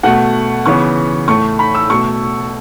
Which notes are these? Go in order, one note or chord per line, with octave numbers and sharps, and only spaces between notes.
B2 A3 F#5
C#3 E3 B3 C#6
A2 A3 C#6
B5
E6
B2 A3 C#6